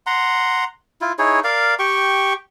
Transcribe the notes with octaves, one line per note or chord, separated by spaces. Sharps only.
F#5 A#5 C6
E4 F4
D#4 E4 G#4 C#5
A#4 D5 F5
G4 G5 C#6